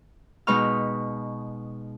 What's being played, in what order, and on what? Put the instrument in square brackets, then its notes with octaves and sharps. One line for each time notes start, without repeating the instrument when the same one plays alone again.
[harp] B2 G#3 D#4 B4 C#6 F6